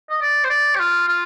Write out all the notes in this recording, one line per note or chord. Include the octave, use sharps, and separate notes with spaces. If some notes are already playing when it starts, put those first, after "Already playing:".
D#5
D5
C5
D5
G4
F4
F4